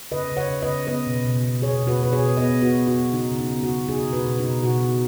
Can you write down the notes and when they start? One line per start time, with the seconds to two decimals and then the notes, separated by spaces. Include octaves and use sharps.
0.12 C#3 B4 D#5
0.32 C#3
0.37 C#5 F#5
0.50 C#3
0.63 B4 D#5
0.68 C#3
0.87 B3 B4 D#5
1.07 B2
1.25 B2
1.44 B2
1.62 B2 G#4 C#5
1.82 B2
1.87 F#4 B4
2.00 B2 B4
2.12 G#4 C#5
2.19 B2
2.37 B3 B4 D#5
2.56 B3
2.62 F#4
2.75 B3
2.87 F#4
2.94 B3
3.13 C#3 D#4
3.31 C#3
3.39 D#4
3.51 B3
3.63 F#4
3.70 C#3
3.89 D#4 G#4
4.07 B2
4.13 F#4 B4
4.25 B2
4.39 D#4
4.44 B2
4.63 B2 F#4
4.83 D#4